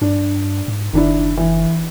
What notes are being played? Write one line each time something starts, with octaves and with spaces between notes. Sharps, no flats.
G2 D4
G#2
F#1 D#3 D4 E4
E3